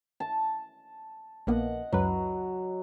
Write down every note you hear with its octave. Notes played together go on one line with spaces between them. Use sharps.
A5
A#1 A#3 B3 D#5 F#5
C#2 F#2 F#3 B4